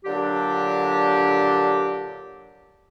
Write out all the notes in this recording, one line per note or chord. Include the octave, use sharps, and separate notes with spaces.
A#2 D3 F#3 D4 G4